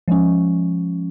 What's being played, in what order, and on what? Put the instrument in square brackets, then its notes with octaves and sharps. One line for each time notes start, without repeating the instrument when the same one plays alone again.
[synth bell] F3 G#3 C#4